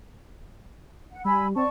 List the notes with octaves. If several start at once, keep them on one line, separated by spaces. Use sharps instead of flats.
F#5
G3 G#5 B5 E6
C4 D5 A5 C#6